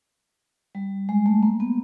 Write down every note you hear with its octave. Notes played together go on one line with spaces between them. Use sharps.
G3
G#3
A3
A#3
B3